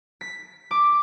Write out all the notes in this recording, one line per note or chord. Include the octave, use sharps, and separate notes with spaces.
B6
D6